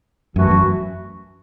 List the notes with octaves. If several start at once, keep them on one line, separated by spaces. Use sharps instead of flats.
F#2 E3 A3 F#4
F#2